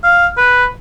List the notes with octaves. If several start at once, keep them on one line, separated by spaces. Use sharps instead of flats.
F5
B4